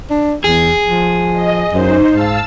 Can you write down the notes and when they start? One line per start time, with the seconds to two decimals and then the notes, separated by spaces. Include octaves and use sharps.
0.10 D4
0.44 E2 G#4
0.86 F3
1.33 D#5
1.73 F#2 D#4 C5
2.11 G#2 F5 A5 E6